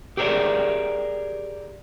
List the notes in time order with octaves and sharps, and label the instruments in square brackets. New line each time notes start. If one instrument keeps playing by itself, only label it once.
[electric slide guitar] G4 G#4 A#4 C#5 D5